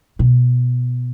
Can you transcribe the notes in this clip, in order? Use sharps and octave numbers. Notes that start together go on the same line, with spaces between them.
B2